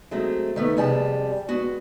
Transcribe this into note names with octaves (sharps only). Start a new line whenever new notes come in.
F#3 G#3 A3 C4
D#3 A3 B3
F2 C3 G3 G#4 G#5 A5
G#3 B3 F#4